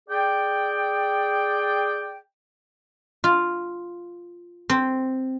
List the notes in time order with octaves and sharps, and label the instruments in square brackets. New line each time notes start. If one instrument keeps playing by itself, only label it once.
[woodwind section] G#4 D5 G5
[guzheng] F4
C4